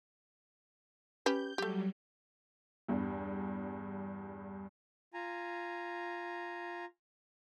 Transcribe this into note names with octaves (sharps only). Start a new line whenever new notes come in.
C#4 G4 B4 G6
F#3 G3 A3 G4
E2 G2
F4 G#5 A#5